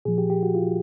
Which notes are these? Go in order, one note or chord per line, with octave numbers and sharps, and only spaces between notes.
A#2 F3 G#4
G4
G4
F#4
F4